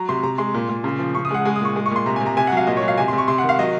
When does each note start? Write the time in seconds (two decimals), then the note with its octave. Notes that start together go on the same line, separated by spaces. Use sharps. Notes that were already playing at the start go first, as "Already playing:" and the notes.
Already playing: F#3 A#5
0.09 C3 C6
0.23 C3 A#5
0.38 G#3 C6
0.54 A#2
0.69 A#2
0.84 C#3
0.99 F3
1.15 C#3 C#6
1.25 D#6
1.31 G#3 F#5
1.45 G#3 G#5
1.56 D#6
1.61 A#2 C#6
1.76 G#3
1.86 C#6
1.91 A#2 C6
2.06 C3 A#5
2.16 G#5
2.21 C3
2.26 A#5
2.37 C3 G#5
2.47 F#5
2.52 F#3 F5
2.67 A#2 D#5
2.77 C#5
2.82 F#3
2.88 F5
2.98 C3 G#5
3.08 C6
3.13 C3
3.18 C#6
3.28 C3 C6
3.38 F#5
3.43 D#3
3.49 F5
3.59 F#3 D#5